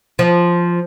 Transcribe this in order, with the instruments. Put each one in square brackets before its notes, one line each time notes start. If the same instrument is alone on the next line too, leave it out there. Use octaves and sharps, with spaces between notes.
[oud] F3